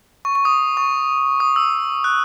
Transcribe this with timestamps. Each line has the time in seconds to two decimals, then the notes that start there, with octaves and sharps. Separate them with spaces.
0.25 C#6
0.35 C#6
0.45 D#6
0.77 C#6
1.40 D#6
1.56 E6
2.04 F#6